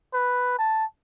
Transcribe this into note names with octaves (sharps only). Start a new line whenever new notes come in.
B4
A5